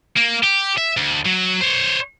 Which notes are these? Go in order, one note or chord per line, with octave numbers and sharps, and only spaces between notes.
A#3
G4
E5
D2
F#3
C5 C#5